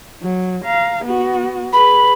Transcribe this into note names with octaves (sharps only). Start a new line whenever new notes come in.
F#3
F5 A#5
B3 F#4
G#4 B4 B5